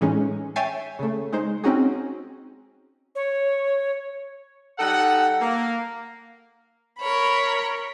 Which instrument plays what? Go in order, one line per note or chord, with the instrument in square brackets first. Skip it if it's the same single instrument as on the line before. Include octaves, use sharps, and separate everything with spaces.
[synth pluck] A2 E3 G#3 C#4 D#4
C#5 E5 G5 G#5 A6 C7
C#3 A3
G#3 D#4 C5
C4 C#4 D#4 F#4 G#4
[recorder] C#5
[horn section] G3 D#4 A4 F#5
A#3
[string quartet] A#4 C#5 B5